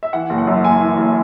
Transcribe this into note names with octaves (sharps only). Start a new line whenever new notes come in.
E5
E3 F#5
F#1
F#5
F#2
F#1 G#5
E3
F#1